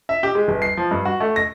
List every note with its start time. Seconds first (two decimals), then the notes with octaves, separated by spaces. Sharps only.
0.09 E5
0.23 G4
0.35 G#3
0.48 G1
0.62 C7
0.77 F3
0.91 G2
1.05 F#4
1.20 A3
1.36 A#6